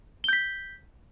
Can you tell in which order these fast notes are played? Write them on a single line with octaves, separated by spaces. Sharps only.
G7 G6 B6